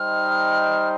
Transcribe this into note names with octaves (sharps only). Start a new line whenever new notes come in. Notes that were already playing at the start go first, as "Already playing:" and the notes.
Already playing: G3 D#4 C5 D#5 G5 F6